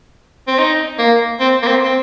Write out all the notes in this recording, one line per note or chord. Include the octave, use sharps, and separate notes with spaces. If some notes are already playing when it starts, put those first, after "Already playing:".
C4
D#4
A#3
C4
A#3
C4
C4